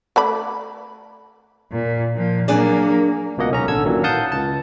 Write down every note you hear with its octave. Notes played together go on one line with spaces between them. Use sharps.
A3 D5 B5
A#2
A#2 F3
F#3 A#3 D4 G#4 D5
C#2 B2 A#3 D#5 F#5
B1 C#4 A#5
A1 D3 A4 E6 G#6
F#2 A#2 D#3 E3 F#3
F5 F#5 A5 D#6 G6
C#2 A5